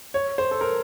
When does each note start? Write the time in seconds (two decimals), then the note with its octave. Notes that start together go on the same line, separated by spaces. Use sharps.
0.14 C#5
0.38 C5
0.51 A4
0.61 A#4